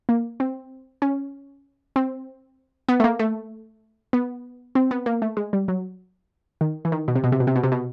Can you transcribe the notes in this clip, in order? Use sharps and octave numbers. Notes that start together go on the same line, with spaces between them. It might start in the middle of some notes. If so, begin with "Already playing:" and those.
A#3
C4
C#4
C4
B3
A3
A#3
A3
B3
C4
B3
A#3
A3
G#3
G3
F#3
D#3
E3
D#3
B2
C3
B2
C3
B2
C3
B2
C3
B2